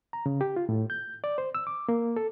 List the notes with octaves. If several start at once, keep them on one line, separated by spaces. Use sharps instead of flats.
A#5
C#3
G4
F4
A2
G6
D5
C5
E6
D6
A#3
A4